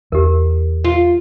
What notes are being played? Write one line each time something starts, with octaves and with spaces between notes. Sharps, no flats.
E2 E3 G4 A#4
F4